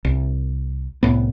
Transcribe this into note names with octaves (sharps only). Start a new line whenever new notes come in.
C2
C2 A2 B3